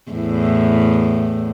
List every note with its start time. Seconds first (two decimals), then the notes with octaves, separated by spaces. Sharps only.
0.11 E2 A2